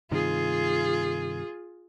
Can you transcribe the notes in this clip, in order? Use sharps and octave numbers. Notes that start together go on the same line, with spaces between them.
G2 C3 D#3 F4 G#4